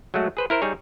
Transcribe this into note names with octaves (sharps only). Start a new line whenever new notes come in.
F#3 G#3 A3 F#4
G#4 B4 C5
E4 A#4 C5
G3 D#4 G#4 C#5